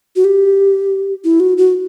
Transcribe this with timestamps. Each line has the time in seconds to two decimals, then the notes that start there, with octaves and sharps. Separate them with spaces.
0.16 F#4
0.24 G4
1.24 E4
1.40 F#4
1.58 F#4